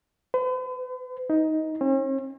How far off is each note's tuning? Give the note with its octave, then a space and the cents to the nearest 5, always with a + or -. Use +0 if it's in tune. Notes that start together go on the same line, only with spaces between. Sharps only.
B4 +45
D#4 +15
C#4 -45